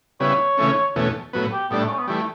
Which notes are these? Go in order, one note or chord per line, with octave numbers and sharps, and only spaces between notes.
C#3 G3 B3 E4 C#5
C#3 E3 A3 C#4
E2 B2 A3 C#4
A2 F#3 B3
G4
A2 G3 B3 D4
A3
C#4
B3
E3 G3 A3